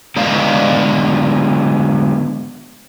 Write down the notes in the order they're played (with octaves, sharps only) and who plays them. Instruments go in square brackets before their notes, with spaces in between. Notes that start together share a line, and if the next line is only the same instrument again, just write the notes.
[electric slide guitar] D3 G#3 B3 D5 D#5 F5